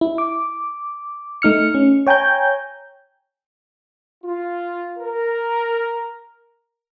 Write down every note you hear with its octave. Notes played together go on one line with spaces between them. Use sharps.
E4
D6
A3 D#4 F6 C#7
C#4
C#5 G5 G#5 A#5 G6
F4
A#4